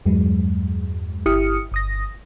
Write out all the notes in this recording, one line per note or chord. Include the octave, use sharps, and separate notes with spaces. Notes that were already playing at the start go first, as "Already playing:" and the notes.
E2 G2 F#3 G#3
G1 E4 G4 D#6 F6 C#7
G1 D#6 A#6